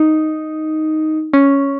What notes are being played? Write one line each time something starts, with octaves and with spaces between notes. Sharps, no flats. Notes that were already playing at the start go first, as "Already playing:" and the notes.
Already playing: D#4
C#4